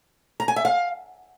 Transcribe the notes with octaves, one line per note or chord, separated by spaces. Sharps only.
A#5
G#5
E5
F5